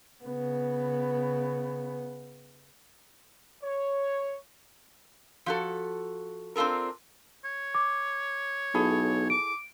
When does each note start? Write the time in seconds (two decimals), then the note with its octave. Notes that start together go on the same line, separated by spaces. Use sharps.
0.24 C#3 B3
3.64 C#5
5.46 F3 F#4 A4
6.56 C4 D4 F4 A4 A#4
7.45 C#5
7.75 D6
8.74 B1 E4 G#4 A4
9.30 D6 D7